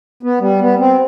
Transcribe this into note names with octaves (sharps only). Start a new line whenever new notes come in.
B3
G3
B3
C4